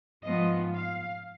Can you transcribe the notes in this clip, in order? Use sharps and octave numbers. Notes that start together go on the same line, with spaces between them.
G#2 F3 G#3 B3 F4 D#5
F5